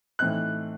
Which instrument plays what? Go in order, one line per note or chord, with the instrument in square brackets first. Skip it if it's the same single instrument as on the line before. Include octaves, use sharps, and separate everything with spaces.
[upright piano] A2 E3 C4 D#4 F#6